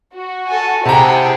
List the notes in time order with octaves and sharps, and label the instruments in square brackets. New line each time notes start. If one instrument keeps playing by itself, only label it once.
[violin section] F#4
[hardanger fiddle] A4 G#5
[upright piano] C3 A#5 [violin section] E4 G#4 A5 [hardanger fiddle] F#5 G5